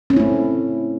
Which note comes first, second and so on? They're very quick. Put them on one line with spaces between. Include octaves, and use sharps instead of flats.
C#4 C4 E4 A3